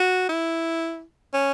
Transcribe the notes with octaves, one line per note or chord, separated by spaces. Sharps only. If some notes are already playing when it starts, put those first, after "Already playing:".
Already playing: F#4
E4
C#4